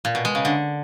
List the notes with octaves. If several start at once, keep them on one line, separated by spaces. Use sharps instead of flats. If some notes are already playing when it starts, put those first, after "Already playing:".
A#2
B2
G#3
C#3
D3